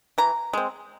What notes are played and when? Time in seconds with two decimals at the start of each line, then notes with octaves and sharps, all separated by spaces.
0.18 E3 A#5
0.53 G#3 C4